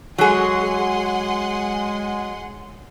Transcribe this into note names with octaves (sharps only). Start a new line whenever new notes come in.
F#3 G#3 G#4 F#5 G#5 C6